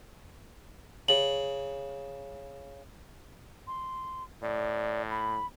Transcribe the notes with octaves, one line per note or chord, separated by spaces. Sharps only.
C#3 F#7
C6
A2 D5
B5